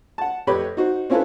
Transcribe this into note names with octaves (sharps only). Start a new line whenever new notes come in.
F#5 A5
F2 A3 G4 B4 C#5 B5
D#4 F#4 C5
C4 C#4 E4 F4 A4 B4